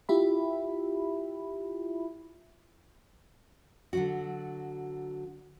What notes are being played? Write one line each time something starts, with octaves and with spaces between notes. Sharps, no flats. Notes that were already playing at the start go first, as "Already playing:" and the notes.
E4 F4 G4 E5 B5
D3 F#3 F#4